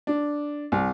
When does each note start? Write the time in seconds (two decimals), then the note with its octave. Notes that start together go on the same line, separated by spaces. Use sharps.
0.07 D4
0.72 C2